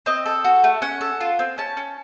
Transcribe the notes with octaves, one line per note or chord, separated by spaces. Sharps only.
C4 D#5
A4
F#4
A3
C#4 F#5
A4
F4
C4
C#4 A5
C#4